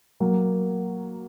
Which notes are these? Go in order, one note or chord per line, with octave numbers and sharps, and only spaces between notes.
F#3 A#3